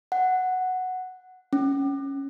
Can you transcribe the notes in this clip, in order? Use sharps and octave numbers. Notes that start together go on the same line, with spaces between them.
F#5
C#4